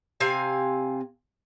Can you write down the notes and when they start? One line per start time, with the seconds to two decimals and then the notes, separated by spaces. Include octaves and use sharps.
0.20 C3 C4 F5 G#5